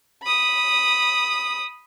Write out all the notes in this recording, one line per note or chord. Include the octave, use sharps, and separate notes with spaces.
B5 D#6